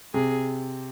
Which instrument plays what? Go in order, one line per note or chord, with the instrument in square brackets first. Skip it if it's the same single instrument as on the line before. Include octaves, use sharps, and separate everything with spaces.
[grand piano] C3 [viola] G#4